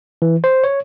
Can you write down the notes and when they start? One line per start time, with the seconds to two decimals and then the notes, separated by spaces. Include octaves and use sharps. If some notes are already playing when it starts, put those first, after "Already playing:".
0.22 E3
0.44 C5
0.64 C#5